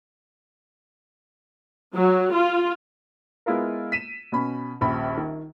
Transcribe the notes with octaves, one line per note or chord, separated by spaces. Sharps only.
F#3
F4
G#3 B3 E4 F4 A#4
B6 D#7 E7
B2 C#4 B5
D#1 A#1 B5
D#3